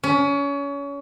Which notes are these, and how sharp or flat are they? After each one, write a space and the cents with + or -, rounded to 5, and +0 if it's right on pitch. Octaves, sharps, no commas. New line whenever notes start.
C#4 +30